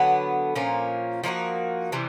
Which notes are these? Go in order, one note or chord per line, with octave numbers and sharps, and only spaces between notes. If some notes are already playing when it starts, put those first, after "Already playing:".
Already playing: D3 F#3 B3
A#2 F3 A#3 C#4
F3 A#3 D#4 F#4
C3 E3 G3